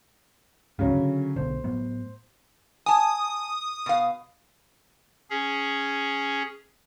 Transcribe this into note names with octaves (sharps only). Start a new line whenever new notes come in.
C#2 G#2 C#3 F#3 C#4
D3
B1 B2 D3 C5
A2 F#3 B3
G#5 A5 D#6
B2 F5
C#4 G#4